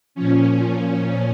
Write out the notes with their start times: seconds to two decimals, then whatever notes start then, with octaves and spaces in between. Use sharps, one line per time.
0.15 A#2 F3 C#4
0.66 C#4